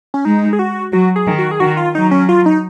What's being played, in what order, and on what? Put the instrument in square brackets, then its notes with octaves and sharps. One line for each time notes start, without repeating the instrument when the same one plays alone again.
[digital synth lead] C#4
[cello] G#3 [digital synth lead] D#4
[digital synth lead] G#4
F#4
[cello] F#3 [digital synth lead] F#4
[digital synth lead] G#4
[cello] D#3
[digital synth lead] F#4
G#4
[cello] D#3 [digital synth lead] F#4
[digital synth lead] F4
[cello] F#3 [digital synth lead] D#4
[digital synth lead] C#4
F4
D#4